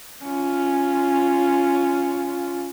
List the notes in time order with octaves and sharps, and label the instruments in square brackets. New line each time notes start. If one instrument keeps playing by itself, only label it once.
[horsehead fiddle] C#4 F4